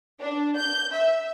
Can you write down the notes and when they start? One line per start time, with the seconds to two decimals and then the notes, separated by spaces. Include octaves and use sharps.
0.20 D4
0.56 G6
0.94 E5